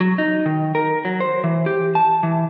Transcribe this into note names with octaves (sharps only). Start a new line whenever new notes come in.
F#3
D#4
D#3
A#4
F#3
C5
E3
G4
A5
E3